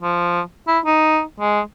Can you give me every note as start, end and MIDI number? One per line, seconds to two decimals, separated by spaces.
0.01 0.42 53
0.68 0.79 64
0.86 1.21 63
1.40 1.61 56